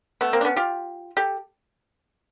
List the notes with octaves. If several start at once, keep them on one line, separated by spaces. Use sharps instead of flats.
A3 B3
A#3 C4
D4
B3 C#4
F4 G4
G4 A4